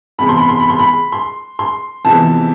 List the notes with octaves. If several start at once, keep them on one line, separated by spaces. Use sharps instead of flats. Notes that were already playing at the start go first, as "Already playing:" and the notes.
E2 C3 G#3 B3 B5
C6
B5
C6
B5
C6
B5
C6
C6
F2 C3 E3 G#3 B3 A5